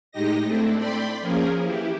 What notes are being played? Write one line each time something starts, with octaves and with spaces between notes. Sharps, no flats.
A2 G#3 D#4 G4 D#5 A#6
A3 C4 D4 E4 A4
D5 G5 B5 C6
F3 A#3 C#4 G#4 A#4
E3 E4 G4